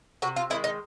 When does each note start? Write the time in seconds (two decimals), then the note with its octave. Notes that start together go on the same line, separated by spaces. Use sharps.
0.22 C3 F#4
0.36 F4
0.50 D#3 G#3 E4
0.64 D#4